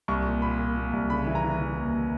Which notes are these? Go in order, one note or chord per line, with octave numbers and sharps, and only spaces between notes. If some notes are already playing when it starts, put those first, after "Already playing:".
C2 C#6
A#2
A#2 B5
A#2
A#2
C2
C#3 B5
E3
A#5
E3
E3
D#2